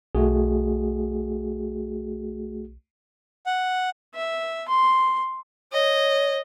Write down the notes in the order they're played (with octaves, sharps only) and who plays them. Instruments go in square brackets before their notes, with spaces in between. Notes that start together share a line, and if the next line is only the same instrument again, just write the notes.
[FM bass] B1 [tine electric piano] A3 F#4 G#4
[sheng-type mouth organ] F#5
[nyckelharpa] E5
C6
[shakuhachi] C#5 [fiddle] D#5